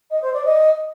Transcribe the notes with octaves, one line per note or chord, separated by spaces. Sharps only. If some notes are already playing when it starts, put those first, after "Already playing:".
D#5
C5
D5
D#5